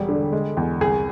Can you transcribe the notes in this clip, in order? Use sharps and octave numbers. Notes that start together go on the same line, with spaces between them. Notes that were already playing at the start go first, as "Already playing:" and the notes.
Already playing: E1 G3
D3
G#3
E2
C2 G#4